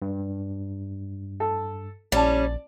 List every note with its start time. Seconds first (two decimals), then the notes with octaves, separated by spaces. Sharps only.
0.02 G2
1.40 A4
2.12 A#1 G3 C#4 D5 A5